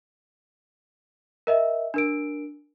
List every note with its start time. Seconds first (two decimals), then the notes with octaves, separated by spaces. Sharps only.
1.47 A#4 D#5 E5
1.94 D4 A#4 D7